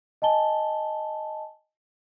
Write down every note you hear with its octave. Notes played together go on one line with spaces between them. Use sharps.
D#5 G#5 A5 G7